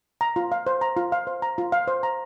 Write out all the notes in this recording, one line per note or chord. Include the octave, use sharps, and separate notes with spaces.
A#5
F4
F5
C5
A#5
F4
F5
C5
A#5
F4
F5
C5
A#5